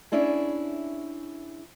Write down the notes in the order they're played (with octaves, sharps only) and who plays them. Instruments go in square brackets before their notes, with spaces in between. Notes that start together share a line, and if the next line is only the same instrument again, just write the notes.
[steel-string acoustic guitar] C#4 D4 E4 G#4